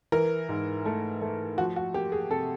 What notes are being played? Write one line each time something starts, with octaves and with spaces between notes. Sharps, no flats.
E3 A#4
G#2
A3
A3
F3 F#4
F#4
A#3 G4
G#4
C3 A4